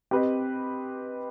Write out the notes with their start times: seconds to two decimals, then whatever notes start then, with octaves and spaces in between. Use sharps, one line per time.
0.11 C4 G4 B4 D#5